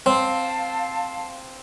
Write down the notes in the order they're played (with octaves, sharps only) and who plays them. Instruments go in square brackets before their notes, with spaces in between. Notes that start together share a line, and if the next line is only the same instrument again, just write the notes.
[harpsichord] C4 [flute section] F5 A5